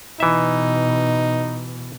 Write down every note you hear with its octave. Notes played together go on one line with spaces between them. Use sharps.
B2 E3 D#4 E5